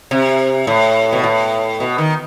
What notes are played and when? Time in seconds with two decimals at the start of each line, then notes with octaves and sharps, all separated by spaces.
0.11 C3
0.67 A2
1.13 B2
1.24 A2
1.80 B2
1.98 D#3